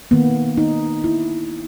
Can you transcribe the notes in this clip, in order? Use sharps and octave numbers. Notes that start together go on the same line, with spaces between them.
D#3 A#3 B3
D#4
E4